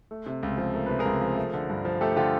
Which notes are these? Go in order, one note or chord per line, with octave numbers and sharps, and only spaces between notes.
A3
C3
C#2
F3
A3 A#4
C3 B4
G#4 A#4
C#2
F3
A3
D3
G2
F3
A3 G4 A4
D3 F4 G4